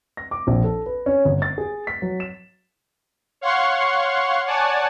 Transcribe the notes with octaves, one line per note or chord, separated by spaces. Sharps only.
A#6
D6
A#1
A4
B4
C#4
G1
A6
G#4
B6
F#3
E7
C#5 F5 F#5 C6 C#6
C#5 D5 F#5 G#5 A5